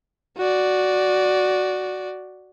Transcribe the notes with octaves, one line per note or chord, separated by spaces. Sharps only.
F#4 D5